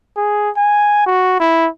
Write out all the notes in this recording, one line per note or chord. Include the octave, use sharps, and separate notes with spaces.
G#4
G#5
F#4
E4